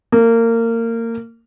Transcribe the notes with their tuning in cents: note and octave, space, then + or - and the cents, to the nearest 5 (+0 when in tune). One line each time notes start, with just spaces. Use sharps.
A#3 -25